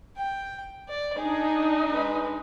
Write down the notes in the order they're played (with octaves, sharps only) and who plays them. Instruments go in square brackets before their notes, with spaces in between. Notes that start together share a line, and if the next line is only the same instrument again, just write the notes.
[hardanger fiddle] G5
D5
[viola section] D4 D#4 [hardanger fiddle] G#4
[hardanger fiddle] G#3 B4